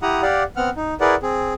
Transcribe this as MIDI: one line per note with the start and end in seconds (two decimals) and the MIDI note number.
0.02 0.22 64
0.02 0.22 67
0.02 0.22 78
0.02 0.22 82
0.02 0.22 87
0.22 0.43 67
0.22 0.43 74
0.22 0.43 77
0.22 0.43 78
0.56 0.70 59
0.56 0.70 60
0.56 0.70 78
0.56 0.70 89
0.76 0.94 63
1.00 1.15 64
1.00 1.15 68
1.00 1.15 70
1.00 1.15 71
1.00 1.15 74
1.00 1.15 78
1.22 1.54 60
1.22 1.54 68